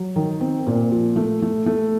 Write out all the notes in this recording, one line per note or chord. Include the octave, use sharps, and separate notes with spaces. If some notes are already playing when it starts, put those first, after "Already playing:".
Already playing: F#3
D#3
C4
A#2
F3
A3
A3
A3